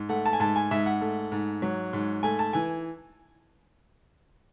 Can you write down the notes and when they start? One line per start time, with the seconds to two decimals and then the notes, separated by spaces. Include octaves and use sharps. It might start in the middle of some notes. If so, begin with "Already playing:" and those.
Already playing: G#2
0.09 A3 F#5
0.26 A5
0.33 G#5
0.40 G#2 A5
0.56 G#5
0.71 G#2 E5
0.86 F#5
1.01 A3
1.32 G#2
1.62 F#3
1.93 G#2
2.23 A3 G#5
2.39 A5
2.53 E3 G#5